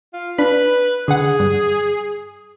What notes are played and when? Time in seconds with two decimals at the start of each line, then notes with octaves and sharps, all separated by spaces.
0.14 F4
0.38 D4 B4 B5
1.08 D3 G#4 F#5
1.40 G2